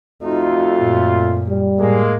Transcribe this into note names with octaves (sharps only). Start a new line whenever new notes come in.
F2 A3 D#4 F4 F#4
F#2 A#2
G3
A2 G#3 A#3